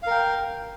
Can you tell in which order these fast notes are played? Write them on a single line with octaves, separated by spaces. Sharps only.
F5 A#4 G5